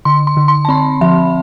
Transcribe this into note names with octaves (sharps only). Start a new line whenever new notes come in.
D3 C6
C6
D3
C6
A5
C4 B5
F3 E5